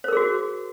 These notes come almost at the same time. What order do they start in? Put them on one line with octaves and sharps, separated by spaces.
C5 A#4 G#4 F#4